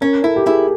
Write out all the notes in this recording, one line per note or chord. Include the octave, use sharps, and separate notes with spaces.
C#4 A#4
E4 A4
G4
E4 G#4